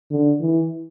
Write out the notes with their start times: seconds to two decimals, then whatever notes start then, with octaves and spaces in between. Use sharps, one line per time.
0.11 D3
0.40 E3